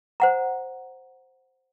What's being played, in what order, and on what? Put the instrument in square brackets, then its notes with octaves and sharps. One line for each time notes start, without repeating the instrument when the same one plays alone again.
[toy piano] C5 F#5 A#5